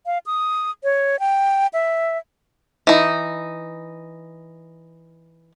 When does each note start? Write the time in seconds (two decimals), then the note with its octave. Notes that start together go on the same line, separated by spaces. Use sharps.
0.06 F5
0.26 D#6
0.84 C#5
1.20 G5
1.73 E5
2.87 E3 D#4